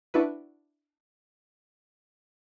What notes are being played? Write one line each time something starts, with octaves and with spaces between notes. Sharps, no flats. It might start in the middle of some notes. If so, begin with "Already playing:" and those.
D4 E4 F#4 B4